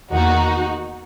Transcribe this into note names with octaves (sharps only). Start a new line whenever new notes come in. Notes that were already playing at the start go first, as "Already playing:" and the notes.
E2 D#3 A#3 D#4 F#4